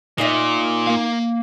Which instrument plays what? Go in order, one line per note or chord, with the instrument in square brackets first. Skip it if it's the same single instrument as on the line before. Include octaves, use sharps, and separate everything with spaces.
[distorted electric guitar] A#2 [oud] D#4 D#5 E5
[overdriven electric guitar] A#3 F5